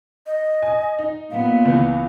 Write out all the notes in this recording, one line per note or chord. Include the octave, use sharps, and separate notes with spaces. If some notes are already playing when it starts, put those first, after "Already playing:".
D#5
G#5
D#4
A#2 B3 F5
C#2 E3